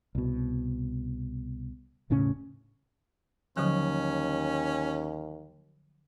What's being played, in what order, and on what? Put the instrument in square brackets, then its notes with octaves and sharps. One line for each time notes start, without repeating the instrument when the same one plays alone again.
[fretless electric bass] C2 B2
E1 A2 C#3 C#4
[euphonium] D#2 [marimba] D3 F3 F#3 [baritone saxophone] C#4